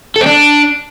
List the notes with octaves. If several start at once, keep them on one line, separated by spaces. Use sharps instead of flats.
A4
C4
D4